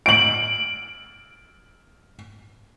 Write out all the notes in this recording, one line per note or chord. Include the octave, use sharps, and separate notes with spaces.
D7 F#7